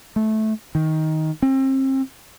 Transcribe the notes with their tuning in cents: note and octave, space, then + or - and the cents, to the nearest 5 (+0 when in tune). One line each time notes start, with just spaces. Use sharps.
A3 -15
D#3 +15
C4 +35